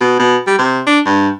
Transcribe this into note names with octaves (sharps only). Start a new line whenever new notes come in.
B2
B2
G3
C3
D4
G2